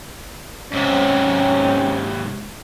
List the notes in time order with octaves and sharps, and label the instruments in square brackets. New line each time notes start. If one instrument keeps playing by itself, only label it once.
[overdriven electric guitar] G#2 C3 [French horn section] C4 C#4